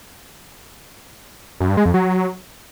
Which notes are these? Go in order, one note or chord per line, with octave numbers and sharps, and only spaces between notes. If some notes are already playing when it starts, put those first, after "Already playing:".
F#2
G2
G#3
F2
F#3